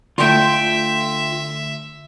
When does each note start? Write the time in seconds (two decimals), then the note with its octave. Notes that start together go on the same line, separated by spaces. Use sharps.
0.18 D3 A3 F4 E5 G5